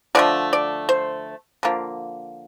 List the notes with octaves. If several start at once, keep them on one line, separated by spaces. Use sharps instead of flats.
D3 F3 A3 D5
D5
C5
D3 F3 A#3